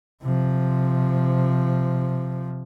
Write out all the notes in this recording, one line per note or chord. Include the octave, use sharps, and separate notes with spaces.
C3 F3